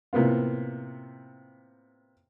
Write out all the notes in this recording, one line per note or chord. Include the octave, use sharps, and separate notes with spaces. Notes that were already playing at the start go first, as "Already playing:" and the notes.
A2 C3 A#3 B3 F4